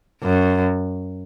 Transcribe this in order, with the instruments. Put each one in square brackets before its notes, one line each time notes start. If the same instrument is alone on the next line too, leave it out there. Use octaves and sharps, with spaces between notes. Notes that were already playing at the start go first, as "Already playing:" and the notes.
[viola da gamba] F#2